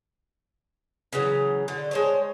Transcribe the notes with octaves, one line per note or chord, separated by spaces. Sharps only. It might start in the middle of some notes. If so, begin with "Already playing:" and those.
C#3 E3 F#3
D3
G#3 C5 C#5